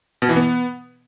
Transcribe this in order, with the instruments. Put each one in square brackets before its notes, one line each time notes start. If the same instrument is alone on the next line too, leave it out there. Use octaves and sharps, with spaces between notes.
[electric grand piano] B2
E3
B3